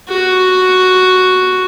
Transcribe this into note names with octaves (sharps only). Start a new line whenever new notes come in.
F#4